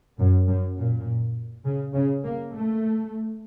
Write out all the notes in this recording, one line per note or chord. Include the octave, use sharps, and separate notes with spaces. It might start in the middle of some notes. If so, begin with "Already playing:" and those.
F#2
F#2
A#2
C#3
C#3
A#3
A3